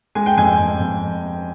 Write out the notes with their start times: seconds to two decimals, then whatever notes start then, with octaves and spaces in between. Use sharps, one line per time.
0.15 G#3 G#5
0.26 G5
0.37 F2 G#5
0.59 F2
0.80 F2